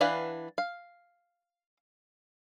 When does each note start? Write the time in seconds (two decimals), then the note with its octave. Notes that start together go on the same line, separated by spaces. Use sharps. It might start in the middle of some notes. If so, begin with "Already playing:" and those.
0.01 E3 D4 B4 F5 F#5
0.58 F5